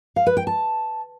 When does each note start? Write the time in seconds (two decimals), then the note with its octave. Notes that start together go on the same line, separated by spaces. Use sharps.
0.16 F5
0.26 B4
0.37 G5
0.47 A5